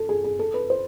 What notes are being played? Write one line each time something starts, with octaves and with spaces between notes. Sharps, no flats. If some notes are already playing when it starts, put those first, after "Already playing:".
Already playing: A4
G#4
G#4
A4
B4
C5